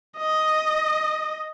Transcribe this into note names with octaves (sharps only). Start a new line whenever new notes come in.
D#5